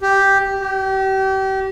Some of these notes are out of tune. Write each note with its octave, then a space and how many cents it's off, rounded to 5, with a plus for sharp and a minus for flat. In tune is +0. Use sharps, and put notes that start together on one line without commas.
G4 +0
G4 -35